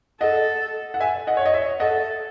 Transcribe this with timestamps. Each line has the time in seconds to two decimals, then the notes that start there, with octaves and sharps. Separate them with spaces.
0.20 A4 D#5 F#5
0.94 F#5
1.00 E5 G#5
1.27 D#5 F#5
1.37 C#5
1.46 D#5
1.53 C#5 E5
1.80 A4 D#5 F#5